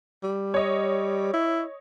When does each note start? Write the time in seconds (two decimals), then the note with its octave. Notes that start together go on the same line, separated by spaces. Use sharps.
0.23 G3
0.54 C#5 D#5
1.33 E4